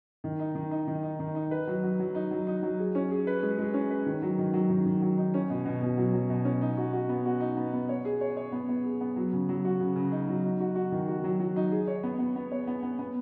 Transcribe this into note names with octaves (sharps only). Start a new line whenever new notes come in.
D#3
D#4
D#3
D#4
D#3
D#4
D#3
D#4
B4
F#3
F#3
F#3
D#4
F#3
D#4
F#3
G#4
C#4
G#4
B4
G#3
G#3
C#4
B4
D#3
F#3
D#3
F#3
D#3
D#3
F#3
D#4
C#4
B2
B2
B2
F#3
F#3
B2
C#4
D#4
F#4
F#4
B3
F#4
D#4
B3
B3
C#5
G#4
C#5
C#5
B3
B3
G#4
B3
F#3
C#3
F#3
F#4
C#3
C#3
D#4
F#3
D#4
F#4
F#4
D#3
F#4
F#3
F#3
D#4
G#4
C#5
B3
B3
B3
C#5
B3
B3
B3